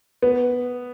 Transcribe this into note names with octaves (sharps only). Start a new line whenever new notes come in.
B3